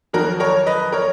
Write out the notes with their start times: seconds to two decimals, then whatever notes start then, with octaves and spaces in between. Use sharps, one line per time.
0.13 F2 D#3 F#3 F#4 A#4
0.40 A#4 C#5
0.66 B4 D#5
0.92 A#4 C#5